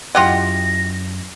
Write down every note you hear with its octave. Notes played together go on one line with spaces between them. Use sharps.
F#2 E4 F4 G4 D#5 F#5 A#6